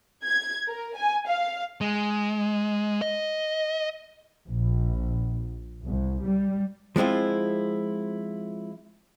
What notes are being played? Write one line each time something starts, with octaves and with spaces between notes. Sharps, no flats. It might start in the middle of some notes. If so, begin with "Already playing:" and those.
G#6
A#4
G#5
F5
G#3
D#5
A#1
C2
G3
F3 G#3 C4 E4 F4